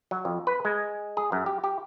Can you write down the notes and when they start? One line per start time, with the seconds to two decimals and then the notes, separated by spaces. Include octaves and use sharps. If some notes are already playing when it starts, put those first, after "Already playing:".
0.11 F#3
0.25 F2
0.47 B4
0.65 G#3
1.17 G#4
1.32 F#2
1.46 G4
1.64 G4